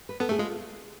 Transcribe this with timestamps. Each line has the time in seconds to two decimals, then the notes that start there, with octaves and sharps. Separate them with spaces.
0.09 B4
0.20 B3 A4
0.29 A3 G#4
0.38 G#3 F4